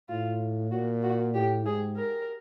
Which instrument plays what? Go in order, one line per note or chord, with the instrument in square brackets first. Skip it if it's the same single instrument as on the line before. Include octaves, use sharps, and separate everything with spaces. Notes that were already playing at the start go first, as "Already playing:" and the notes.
[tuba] A2 [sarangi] F4
[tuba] A#2 [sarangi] F#4
[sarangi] F#4
[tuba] A2 [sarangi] G4
[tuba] G#2 [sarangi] G#4
[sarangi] A#4